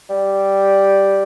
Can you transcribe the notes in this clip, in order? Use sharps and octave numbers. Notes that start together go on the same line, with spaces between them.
G3